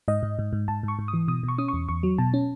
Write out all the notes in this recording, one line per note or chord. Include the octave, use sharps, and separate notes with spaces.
G#2 D#5
G#2
G#2
G#2
G#2 A5
G#2 C#6
G#2
D#6
E3
B2 D#6
B2
C#6
C#4 D#6
C#6
E2
E2 C#6
F#3
B2 A5
C#4